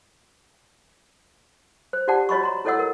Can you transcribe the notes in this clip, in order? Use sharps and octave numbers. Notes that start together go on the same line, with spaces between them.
C5
F4 G4 D5 F#5 A5
F#4 C#5 D#5 B5 C#6
A#5 C6
E4 A4 C#5 D#5 F#5 E6
A#4